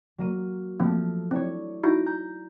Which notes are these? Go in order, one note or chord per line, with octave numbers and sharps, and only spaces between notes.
F#3 A#3 D#7
F3 A3 A#3 C4
C4 D4 E4 C#5
D#4 E4 F#4 G6 A#6 D7
A#5 G6